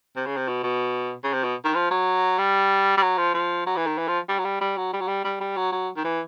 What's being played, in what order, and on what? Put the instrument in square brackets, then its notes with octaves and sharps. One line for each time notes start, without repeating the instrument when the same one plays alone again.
[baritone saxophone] C3
C#3
C3
B2
B2
C#3
C3
B2
D#3
F3
F#3
G3
G3
F#3
F3
F3
F#3
E3
D#3
E3
F3
G3
F#3
G3
G3
F#3
G3
F#3
G3
G3
G3
F#3
F#3
D#3
E3